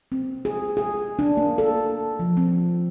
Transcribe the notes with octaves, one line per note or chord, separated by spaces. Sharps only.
C4
G#4
G#4
D4
A#3
A4
F3
C4